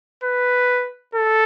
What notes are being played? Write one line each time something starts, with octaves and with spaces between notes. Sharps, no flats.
B4
A4